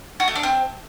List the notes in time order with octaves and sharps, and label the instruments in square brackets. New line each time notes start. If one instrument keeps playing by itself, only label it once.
[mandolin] F#4
A3
D4
C4